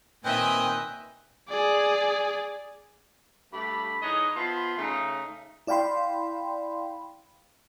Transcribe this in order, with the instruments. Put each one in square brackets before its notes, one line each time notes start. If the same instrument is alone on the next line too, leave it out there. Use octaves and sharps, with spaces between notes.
[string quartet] A#2 D#3 G#5 [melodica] C4 B4 G5 [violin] D#5 E5
[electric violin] G#4 D5
[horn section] G2 A3 G4 B5
E3 D#4 G#4 B4 C#5 D#5
F3 B3 E5 B5 C6
C#3 A3 D#4
[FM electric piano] E4 D5 F5 G5 B5 C6